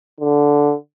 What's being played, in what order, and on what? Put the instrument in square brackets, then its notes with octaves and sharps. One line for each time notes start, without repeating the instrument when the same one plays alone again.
[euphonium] D3